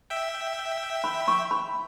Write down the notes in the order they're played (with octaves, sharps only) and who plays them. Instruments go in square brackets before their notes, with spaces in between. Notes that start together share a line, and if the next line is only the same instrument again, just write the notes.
[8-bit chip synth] E5 G5
[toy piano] B5
C#6
B5